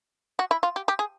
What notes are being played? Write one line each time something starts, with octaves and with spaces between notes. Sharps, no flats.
F#4
E4
F4
G4
G4
G#4